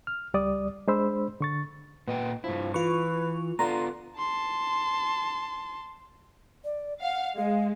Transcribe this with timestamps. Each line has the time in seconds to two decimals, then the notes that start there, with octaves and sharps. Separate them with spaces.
0.07 F6
0.34 C#2 G3 D5 D#6
0.88 G#3 D4 C5 B5 E6
1.41 D3 C#6 A6
2.07 A#2 B3 D#5 G5
2.44 G2 F3 E4
2.74 E3 F4 B4 C#6
3.59 D3 B3 F4 A#5 C6
4.19 A5 C6
6.64 D5
7.01 F5 F#5
7.36 G#3 F5